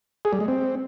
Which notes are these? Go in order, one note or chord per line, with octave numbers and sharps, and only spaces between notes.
G#4
G3
G#3
C4